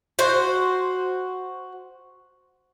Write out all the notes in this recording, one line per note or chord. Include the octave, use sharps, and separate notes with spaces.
F#4 C5